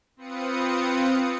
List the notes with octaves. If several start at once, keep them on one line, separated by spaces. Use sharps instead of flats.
C4 F4 B4 D#6 C#7